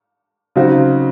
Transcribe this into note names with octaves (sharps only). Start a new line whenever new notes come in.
C#3 F#3 C4 D#4 F#4